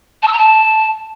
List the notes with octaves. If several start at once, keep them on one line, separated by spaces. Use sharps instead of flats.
A5
E6
A#5
A5